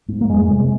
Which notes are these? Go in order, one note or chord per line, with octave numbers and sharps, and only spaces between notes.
G#2
A#3
F2 G#3
C3 G#3